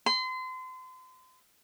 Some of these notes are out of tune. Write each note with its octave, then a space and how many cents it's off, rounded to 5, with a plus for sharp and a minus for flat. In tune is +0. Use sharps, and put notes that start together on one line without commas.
C6 -35